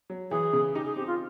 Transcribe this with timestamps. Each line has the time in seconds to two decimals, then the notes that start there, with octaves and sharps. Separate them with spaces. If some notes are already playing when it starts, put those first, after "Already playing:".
0.10 F#3
0.31 E3 G#4
0.53 C#3
0.75 D#4 G4
0.85 G#4
0.96 C4 G4
1.07 F4